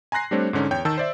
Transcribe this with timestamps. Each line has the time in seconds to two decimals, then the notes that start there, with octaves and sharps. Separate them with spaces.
0.12 G#5 A#5 C6 F#6 A#6 C7
0.31 G3 A3 C4 D4 C5 C#5
0.53 G#2 D3 C#4 D#4
0.71 E2 C#5 G5 G6
0.85 D#3 A5 E6
0.98 C5 D5 E5